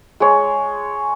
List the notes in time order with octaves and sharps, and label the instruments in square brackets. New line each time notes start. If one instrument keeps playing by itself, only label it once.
[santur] G#3 C#5